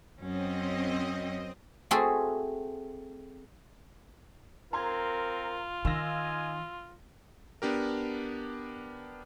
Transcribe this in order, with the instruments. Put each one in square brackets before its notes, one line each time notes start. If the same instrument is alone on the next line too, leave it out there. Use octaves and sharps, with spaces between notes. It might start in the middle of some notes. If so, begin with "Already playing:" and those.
[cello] F#2 C#4 [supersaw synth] C4 D#5
[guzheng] A3 C4 F#4 G#4 A4
[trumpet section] C4 A#4 [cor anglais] F4 [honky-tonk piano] A#5 C6 G#6
[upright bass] D#3 [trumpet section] D#5 F5 G#5 [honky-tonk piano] C6 E6 A#6
[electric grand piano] B3 D4 G4 A#4